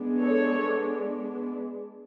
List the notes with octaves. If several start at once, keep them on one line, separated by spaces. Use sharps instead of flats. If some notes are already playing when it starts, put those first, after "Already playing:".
Already playing: G#3 B3 D4
A4 C#5